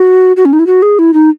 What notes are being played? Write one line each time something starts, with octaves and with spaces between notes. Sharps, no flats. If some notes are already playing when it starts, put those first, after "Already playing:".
Already playing: F#4
F#4
C#4
D#4
E4
F#4
G#4
E4
D#4